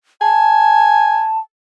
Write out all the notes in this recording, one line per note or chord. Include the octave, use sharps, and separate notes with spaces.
G#5 A5